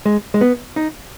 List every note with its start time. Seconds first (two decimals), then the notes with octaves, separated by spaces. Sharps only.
0.05 G#3
0.34 G#3
0.41 B3
0.76 D#4